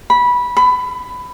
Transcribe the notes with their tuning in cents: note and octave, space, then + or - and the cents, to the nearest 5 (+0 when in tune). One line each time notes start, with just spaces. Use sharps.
B5 -15
B5 +20